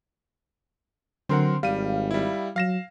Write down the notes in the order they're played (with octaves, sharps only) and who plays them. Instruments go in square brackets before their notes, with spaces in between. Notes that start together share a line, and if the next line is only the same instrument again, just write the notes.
[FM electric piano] D3 C6 [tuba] F#3 [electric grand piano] C4 A#4 F#5
[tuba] G#1 [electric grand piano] G3 D#7 [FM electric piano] F5
[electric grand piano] G3 E4
[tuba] F#3 [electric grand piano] F5 A#6 E7